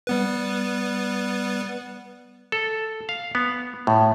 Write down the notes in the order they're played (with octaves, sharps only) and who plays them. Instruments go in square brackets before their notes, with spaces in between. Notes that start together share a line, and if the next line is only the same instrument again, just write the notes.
[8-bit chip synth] G3 B3 B4
[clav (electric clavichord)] A4
F5
B3
A2